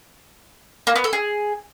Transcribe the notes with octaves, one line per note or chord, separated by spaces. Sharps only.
A#3
B3
A4
G#4